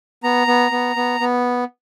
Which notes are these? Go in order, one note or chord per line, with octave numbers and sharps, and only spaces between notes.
B3 A#5
B3
B3
B3
B3